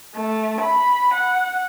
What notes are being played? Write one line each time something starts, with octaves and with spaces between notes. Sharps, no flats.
A3
B5
F#5